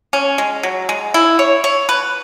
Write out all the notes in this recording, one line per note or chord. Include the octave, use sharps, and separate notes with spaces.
C#4
G#3
F#3
G#3
E4
C#5
C#5
B4